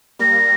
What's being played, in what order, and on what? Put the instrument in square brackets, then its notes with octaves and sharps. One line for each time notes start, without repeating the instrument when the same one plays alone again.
[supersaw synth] G3 A#3 [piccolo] A#6